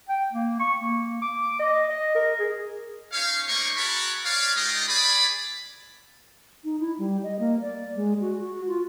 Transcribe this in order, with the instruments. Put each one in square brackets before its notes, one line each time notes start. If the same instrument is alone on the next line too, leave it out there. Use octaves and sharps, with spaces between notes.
[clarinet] G5
A#3
C#6
A#3
D6
D#5
D#5
A#4
G#4
[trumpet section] C#4 D#4 C#5 F5
A3 A#3 D#4 C5 D5 C#6
F#4 G#4 A#4 A5 B5 C#6
B4 C#5 D5 F5
G#3 D#4 F4 G4 D5 D#5
G#4 D5 B5
[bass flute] D#4
E4
G3
D#5
A#3
D5
G#3
F#4
F#4
F4